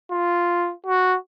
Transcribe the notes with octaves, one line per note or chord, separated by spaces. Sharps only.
F4
F#4